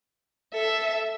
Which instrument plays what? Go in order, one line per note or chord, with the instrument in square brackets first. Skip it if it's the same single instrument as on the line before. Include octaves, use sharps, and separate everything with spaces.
[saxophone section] A4 [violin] E5